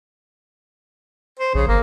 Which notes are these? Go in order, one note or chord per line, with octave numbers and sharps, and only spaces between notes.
C5
A#1 C#3
G1 A#3